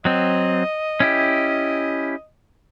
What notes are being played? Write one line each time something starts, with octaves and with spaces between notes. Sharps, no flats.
F#3 C4 D#5
C#4 E4 G4